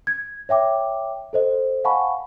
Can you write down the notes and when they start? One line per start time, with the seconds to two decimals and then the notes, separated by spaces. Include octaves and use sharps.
0.07 G#6
0.49 C#5 E5 G5 D6
1.33 A4 C5 D#5
1.84 F5 F#5 G#5 A5 B5 C#6